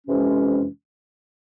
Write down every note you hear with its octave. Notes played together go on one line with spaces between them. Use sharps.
F2 C3 E3 G#3 C#4